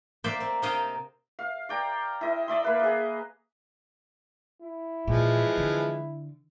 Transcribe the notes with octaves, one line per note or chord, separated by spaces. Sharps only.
A#3 C5 D5 E5 G5
C4
C3 A#4 D#5 F5 G5 A5
F5
D5 G5 A#5
E4 D#5
D5 E5 C6
A#3 B4
G#4 D#5
E4
A#2 E3 F3 G#3
D3